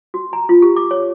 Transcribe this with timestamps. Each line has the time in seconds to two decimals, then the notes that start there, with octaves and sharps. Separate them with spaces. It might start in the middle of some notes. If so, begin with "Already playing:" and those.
0.14 F#4
0.33 A#5
0.49 F4
0.62 G4
0.76 D6
0.91 C#5